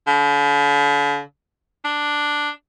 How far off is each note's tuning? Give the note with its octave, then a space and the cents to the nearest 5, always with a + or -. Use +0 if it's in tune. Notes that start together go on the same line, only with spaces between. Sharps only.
D3 -45
D4 +5